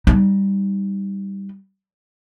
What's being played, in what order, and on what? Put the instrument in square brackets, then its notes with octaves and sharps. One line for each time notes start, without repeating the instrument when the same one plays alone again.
[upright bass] G3 D#4